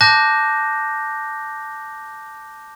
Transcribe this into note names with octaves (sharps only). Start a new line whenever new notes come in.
A5 D6 F#6 G6 A#6